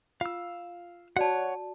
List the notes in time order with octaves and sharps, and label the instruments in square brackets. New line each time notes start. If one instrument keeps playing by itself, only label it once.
[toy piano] F4 [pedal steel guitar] F5 E6
[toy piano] F#4 D5 A5 [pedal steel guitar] C#5 F#5